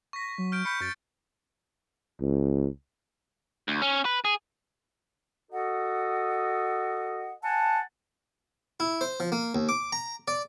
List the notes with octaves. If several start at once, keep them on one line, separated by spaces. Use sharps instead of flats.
C#6 A#6 B6
F#3
F6 G6 D7
B5 G6 B6 C#7
F#2 G6 A6 D7
C#2
D2
C#4
B4
G#4
F#4 A4 D#5 F#5
F#5 G#5 A5
E4
C5
F3
A#3
D#2
D6
A#5
D5